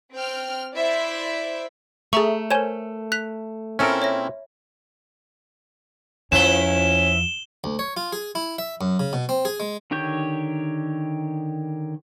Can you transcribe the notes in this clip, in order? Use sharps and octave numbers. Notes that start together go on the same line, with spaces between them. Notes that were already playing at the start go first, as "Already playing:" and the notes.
C4 G5 F6
E4 C5 D5 E5
A3 G#4 A4 E5 A#5 C#6
A#4 C5 C#5 G#5 E7
F#6 B6 F7
A#2 C4 C#4 E4 A4 A#4 E5 B5
C#5 E5 A#6
F2 F3 C#4 E4 B4 E7 G7
D2
C#5
F4
G#4
E4
E5
F#2
C#3
B2
C4
G#4
G#3
D3 D#3 G4 C#5 G6